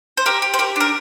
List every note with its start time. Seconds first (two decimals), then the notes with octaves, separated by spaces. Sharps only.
0.17 C5
0.26 G4 A#4
0.42 G4
0.54 C5
0.59 G4 A#4
0.76 D4 A#4